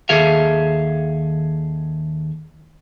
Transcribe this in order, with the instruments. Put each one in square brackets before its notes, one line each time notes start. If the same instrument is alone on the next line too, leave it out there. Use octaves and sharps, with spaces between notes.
[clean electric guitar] D#2 D#3 G#4 A4 E5 F5